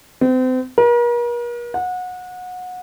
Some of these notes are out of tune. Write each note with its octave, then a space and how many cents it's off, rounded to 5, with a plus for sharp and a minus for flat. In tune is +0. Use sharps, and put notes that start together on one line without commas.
C4 -35
A#4 +45
F#5 -25